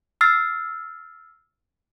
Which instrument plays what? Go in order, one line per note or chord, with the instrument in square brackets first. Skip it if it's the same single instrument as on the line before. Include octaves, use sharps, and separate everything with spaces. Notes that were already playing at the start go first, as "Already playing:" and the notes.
[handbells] E6 F6 A6 C7